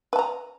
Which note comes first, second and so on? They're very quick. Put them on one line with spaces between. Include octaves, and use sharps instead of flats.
B4 A5 A#5